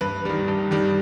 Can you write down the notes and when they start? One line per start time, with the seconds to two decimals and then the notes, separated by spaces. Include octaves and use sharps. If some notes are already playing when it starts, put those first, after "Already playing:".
0.01 G2 B4
0.25 D#3 G3
0.48 G2
0.71 D#3 G3